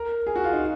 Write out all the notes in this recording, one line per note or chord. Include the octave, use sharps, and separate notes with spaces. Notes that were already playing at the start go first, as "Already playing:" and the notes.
Already playing: A#4
G#4
F#4
F4
D#4